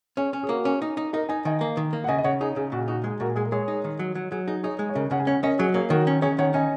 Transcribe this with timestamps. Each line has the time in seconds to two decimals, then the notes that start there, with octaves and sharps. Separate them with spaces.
0.17 C#4 G#4 C#5
0.33 C#4
0.43 G#4
0.49 A#3 F#4 A#4
0.65 C#4
0.82 D#4
0.97 D#4
1.13 D#4 A#4 D#5
1.29 D#4 G#5
1.45 D#3 D#5 G#5
1.61 A#3
1.77 D#3
1.93 A#3
2.04 F#5
2.08 C#3 D#5 G#5
2.18 D#5
2.24 C#3 C#5 F#5
2.41 D#4 G#4
2.56 C#3 G#4
2.72 A#2 F#4
2.88 D#4 F#4
3.04 G#3 G#4
3.20 A#2 F#4 A#4
3.36 G#3 G#4
3.46 A#4
3.52 G#3 G#4 C#5
3.68 D#4
3.84 D#3
3.99 F#3
4.15 F#3
4.31 F#3 G#4
4.47 D#4 G#4
4.63 D#4 G#4 C#5
4.79 G#3
4.89 C#5
4.95 C#3 A#4 D#5
5.11 C#3 C#5 F#5
5.20 G#5
5.27 C#4 C#5 F#5
5.43 C#4 A#4 D#5
5.59 F#3 G#4 C#5
5.74 A#3 G#4 C#5
5.90 D#3 F#4 A#4
6.07 C#4
6.22 C#4 G#4 C#5
6.38 D#3 C#5 F#5
6.54 C#4 D#5 G#5